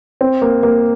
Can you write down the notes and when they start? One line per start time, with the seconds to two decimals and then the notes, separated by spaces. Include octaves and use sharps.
0.21 C4
0.42 A#3
0.63 A#3